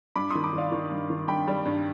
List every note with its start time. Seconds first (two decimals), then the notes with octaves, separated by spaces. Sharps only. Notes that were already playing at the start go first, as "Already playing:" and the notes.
0.16 G2 B5 D6
0.30 D#3 C6 D#6
0.44 B5 D6
0.53 D#3 D5 F5
0.72 D#3
0.91 G2
1.10 D#3
1.28 G2 G5 B5
1.48 G3
1.65 G2